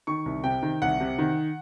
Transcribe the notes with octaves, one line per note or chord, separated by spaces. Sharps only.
D#3 C#6
C2
C3 G5
D#3
C2 F#5
C3
D#3